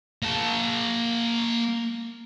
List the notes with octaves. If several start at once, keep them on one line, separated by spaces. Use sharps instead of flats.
A#3 A5